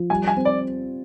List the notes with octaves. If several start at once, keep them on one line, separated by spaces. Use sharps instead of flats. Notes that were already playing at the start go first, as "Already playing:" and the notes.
Already playing: F3
G3 G#5
G#5
C4
D5